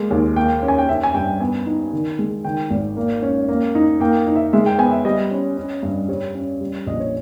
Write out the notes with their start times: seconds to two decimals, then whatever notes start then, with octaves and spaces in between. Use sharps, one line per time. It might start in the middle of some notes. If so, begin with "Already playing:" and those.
Already playing: G#3 A#3
0.10 D#2
0.36 A#3 G5
0.63 C#4
0.68 G#5
0.78 G5
0.89 C#4 E5
1.03 G#5
1.15 G2 G5
1.40 B3 G#5
1.66 D#4
1.93 D#3
2.19 G#3
2.45 D#3 G5
2.71 G#1
2.97 A#3
3.22 C#4
3.49 A#3
3.75 D#4
4.00 A#3 G5
4.27 D#4
4.36 E5
4.53 G#3 E5
4.66 G5
4.78 B3 G#5
4.91 E5
5.05 G3 D#5
5.31 C#4
5.57 C#4
5.83 G2
6.08 G3 C#5
6.35 C#4
6.61 G3
6.87 A#1 D#5
7.00 C#5